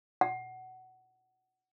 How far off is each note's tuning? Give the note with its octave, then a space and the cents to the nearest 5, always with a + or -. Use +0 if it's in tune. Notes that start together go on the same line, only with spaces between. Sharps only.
F#5 +15